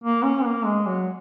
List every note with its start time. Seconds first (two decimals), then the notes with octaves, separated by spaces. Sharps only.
0.04 A#3
0.24 C#4
0.45 A#3
0.65 G#3
0.87 F#3